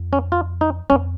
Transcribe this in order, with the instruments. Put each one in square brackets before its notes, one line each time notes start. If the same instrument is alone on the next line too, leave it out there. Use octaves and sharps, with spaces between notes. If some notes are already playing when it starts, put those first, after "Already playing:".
Already playing: [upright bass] F2
[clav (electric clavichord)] C#4
F4
D#4
[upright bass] F2 [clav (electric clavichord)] C#4